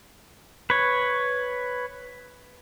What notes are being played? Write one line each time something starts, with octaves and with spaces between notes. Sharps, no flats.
B4 C#5